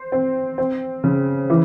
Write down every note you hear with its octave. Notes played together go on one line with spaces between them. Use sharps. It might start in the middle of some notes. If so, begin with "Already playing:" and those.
Already playing: C5
C4
C4
C#3
E3